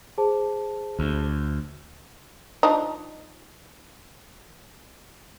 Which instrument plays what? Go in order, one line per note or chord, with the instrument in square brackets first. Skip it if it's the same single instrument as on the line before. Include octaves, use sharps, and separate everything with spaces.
[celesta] G#4 C5 A5
[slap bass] D2
[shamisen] F3 D4 D#4